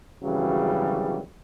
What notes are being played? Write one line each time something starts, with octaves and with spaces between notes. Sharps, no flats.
G#1 F#2 C#3 E3 F#3 G3